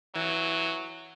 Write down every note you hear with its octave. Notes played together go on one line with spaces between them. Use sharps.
E3 F#3